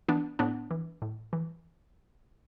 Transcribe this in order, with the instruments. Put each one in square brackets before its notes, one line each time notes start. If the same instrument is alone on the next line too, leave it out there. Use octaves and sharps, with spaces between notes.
[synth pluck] E3 B3 D4
A2 B3 D4
E3
A2
E3